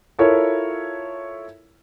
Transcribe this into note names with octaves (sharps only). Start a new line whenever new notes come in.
E4 F4 A4 A#4 C#5 E5